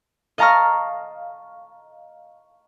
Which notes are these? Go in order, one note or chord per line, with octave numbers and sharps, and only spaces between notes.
D#5 F5 A5 A#5 C#6 F6